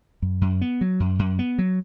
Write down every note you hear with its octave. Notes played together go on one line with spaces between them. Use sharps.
F#2
F#2
B3
F#3
F#2
F#2
B3
F#3